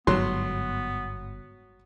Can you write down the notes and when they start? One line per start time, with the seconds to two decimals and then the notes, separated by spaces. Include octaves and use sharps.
0.07 G1 G#2 F#3 B3 C6